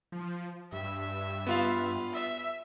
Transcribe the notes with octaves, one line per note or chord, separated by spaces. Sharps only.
F3
G2 E5
B3 F4 F5
E5